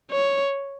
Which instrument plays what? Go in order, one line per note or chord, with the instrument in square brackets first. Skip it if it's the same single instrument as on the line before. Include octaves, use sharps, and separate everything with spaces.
[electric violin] C#5